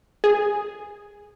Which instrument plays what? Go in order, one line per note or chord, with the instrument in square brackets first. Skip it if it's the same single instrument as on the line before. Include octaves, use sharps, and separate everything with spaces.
[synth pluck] G#4